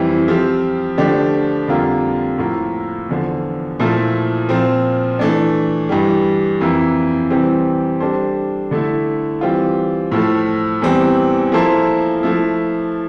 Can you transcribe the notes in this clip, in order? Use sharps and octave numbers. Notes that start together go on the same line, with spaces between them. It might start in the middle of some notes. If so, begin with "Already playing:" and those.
Already playing: F2 E3 G3 C4 E4
F3 C4 G4
D3 F3 A3 D4 G4
F2 D3 G3 A#3 F4
A2 F3 A#3 F4
E2 D3 F3
A#2 F3 A3 E4 A4
A#2 F3 C4
E3 A3 D4
G2 E3 G3
F2 E3 A#3 E4
C3 E3 G3 C4 G4
G3 D4 A4 C5
D3 A3 E4
E3 G3 C4 F4
A2 F3 A3
E2 E3 G3 C4
F3 A#3 E4 A4 C5
F3 A3 E4